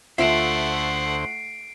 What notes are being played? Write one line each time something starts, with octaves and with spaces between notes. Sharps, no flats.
D2 A3 F4 C5 E5 F#5 C7 D7